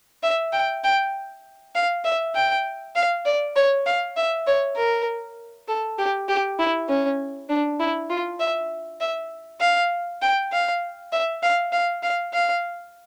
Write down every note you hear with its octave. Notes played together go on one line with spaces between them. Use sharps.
E5
G5
G5
F5
E5
G5
F5
D5
C#5
F5
E5
C#5
A#4
A4
G4
G4
E4
C#4
D4
E4
F4
E5
E5
F5
G5
F5
E5
F5
F5
F5
F5